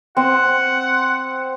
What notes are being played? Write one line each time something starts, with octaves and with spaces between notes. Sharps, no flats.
C4 F#5